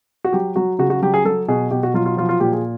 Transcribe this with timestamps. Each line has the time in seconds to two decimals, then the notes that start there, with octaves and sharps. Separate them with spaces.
0.24 F#4
0.33 F#3 G4
0.56 F#3 F#4
0.79 C#3 F#4
0.90 F#4
1.02 F#3 G4
1.14 G#4
1.25 F#3 A4
1.48 B2 G#4
1.71 B2 G4
1.83 F#4
1.94 F#3 F4
2.06 F4
2.17 F3 F4
2.29 F4
2.40 A#2 G4
2.53 G#4